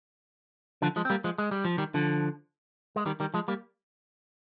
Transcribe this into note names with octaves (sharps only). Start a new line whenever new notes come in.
D3 F3
F3 G#3
C4
G3 A#3
F3 G#3
G#3
G3
F3
D#3 G3
D3 F3
G#3
D#3 G3
D#3 G3
F3 G#3
G3 A#3